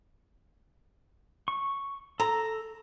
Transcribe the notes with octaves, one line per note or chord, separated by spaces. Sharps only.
C#6
A4 A#5